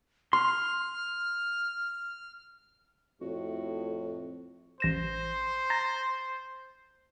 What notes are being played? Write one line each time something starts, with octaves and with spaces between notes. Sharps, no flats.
C6 F6
F2 A2 F#4
A1 C5 A#6 E7
A#5 A6 A#6